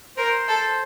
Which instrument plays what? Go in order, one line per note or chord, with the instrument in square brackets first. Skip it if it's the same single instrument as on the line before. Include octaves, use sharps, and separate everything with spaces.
[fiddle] A#4 [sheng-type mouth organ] C5
[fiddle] A4